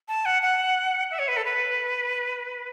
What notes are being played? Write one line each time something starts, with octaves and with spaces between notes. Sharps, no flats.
A5
F#5
F#5
E5
C#5
B4
A4
B4